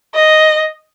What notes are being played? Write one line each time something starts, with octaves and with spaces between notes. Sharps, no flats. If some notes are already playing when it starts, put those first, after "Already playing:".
D#5